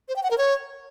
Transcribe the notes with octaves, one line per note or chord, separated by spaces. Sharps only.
C5
G5
F#5
A#4
C#5